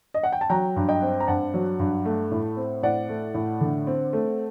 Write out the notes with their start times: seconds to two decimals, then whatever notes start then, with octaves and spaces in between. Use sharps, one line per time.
0.14 D#5
0.23 F#5
0.32 G5
0.41 A5
0.50 F#3 G5 A#5
0.76 G2
0.88 D#5 G5
1.02 C4
1.20 A#5
1.27 G2 F#5 A5
1.54 F#3
1.79 G2
2.06 A3
2.31 A2
2.57 C4
2.83 A2 D5 F#5
3.09 A3
3.34 A2
3.61 D3
3.87 C4
4.13 A3